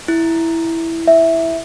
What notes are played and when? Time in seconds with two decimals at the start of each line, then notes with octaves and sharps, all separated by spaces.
0.08 E4
1.07 E5